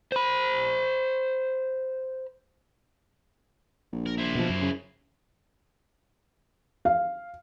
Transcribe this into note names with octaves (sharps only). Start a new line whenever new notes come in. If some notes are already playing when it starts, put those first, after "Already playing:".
C5 B5
A#1
A#4
E4 C5
B2 F3
F#2
C#3
F5